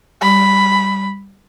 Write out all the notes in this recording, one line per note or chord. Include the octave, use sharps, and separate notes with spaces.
G3 B5